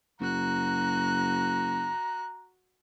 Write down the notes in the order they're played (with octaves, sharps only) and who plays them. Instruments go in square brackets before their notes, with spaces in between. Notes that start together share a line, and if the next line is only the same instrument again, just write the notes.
[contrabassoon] F#1 [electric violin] F#4 F#6 [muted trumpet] A#5